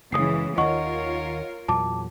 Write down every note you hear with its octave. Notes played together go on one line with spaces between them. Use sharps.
F#1 A#2 C#3 E3 G#3 D#6 C7
D#2 D#3 F4 A#4 C#5 D#5 F#5 C#6
E2 A#2 F#3 A5 D6